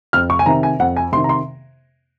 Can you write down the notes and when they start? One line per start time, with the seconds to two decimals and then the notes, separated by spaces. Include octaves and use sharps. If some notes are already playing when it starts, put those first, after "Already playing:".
0.13 F2 F6
0.30 C#6
0.39 G#5
0.46 C3 D#3 A#5
0.63 G#5
0.79 F2 F#5
0.97 G#5
1.12 C3 C6
1.17 D#3
1.24 A#5
1.29 C6